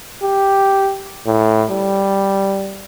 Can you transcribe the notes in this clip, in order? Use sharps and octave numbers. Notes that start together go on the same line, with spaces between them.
G4
A2
G3